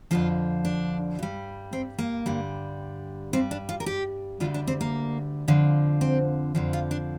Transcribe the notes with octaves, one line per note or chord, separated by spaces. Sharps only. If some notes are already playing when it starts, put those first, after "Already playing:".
F2 D3 F3 F4
D4
G2 G3
C4
A#3
G2 D3 G3
G2 G3 C4
D4
F4
A#4
G4
D2 D3 G3 F4
D4
C4
A#3
F2 D3 F3
C4
F2 D3 F3
F4
D4